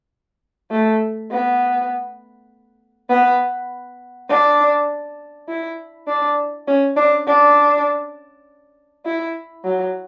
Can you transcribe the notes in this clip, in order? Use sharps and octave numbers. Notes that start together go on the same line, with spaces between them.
A3
B3
B3
D4
E4
D4
C#4
D4
D4
E4
F#3